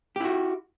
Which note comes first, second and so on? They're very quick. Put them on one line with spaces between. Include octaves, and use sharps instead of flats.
G4 E4 F#4